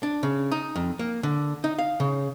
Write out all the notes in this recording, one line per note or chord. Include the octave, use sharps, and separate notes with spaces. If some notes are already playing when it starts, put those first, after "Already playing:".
D4
C#3
D#4
F2
A#3
D3
D#4
F5
C#3